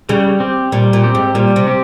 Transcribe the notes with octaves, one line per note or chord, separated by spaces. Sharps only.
C#3 G3
C4 G4
A#2 G3
A#2
C4 G4
G#2
A#2 G3
C3
C4 G4